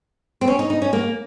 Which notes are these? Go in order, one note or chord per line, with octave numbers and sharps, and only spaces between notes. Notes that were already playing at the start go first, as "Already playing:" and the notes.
C4
C#4
D#4
D#4
C#4
A#3